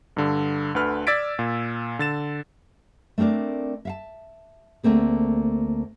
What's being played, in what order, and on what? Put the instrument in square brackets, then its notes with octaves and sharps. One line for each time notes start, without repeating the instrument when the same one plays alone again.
[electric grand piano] G2 D3
D2 D3 B4 F6
D5 E6 G#6 A6 B6 D7
A#2
D3 A6 E7
[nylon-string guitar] A3 C4 D4 A#4 D5
E5 F5 A5
D2 A3 A#3 C4 G#4